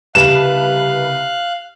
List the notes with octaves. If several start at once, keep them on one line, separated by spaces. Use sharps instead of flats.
C2 C#3 G4 B4 F5 A5 F#6 E7